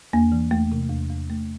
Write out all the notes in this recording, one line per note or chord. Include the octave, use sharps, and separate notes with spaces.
E2 A#3
E3
E2 A3
C3
E2
E2
A3